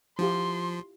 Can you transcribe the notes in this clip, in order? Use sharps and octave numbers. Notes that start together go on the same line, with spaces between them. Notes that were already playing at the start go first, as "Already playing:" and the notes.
F3 E4 F4 G4 C6